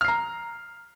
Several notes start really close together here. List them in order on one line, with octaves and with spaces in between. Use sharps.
F6 C7 A#5